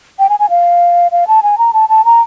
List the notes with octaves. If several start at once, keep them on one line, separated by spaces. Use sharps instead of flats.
G5
G#5
G#5
F5
F5
A5
G#5
A#5
A5
A5
A#5